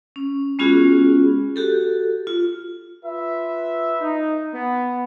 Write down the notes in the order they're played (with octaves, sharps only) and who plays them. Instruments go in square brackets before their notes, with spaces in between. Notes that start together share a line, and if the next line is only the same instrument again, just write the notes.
[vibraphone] C#4
G#3 B3 C#4 F4 F#4 G#4
F#4 G4 A4
F4
[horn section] F4 B4 E5
D#4
B3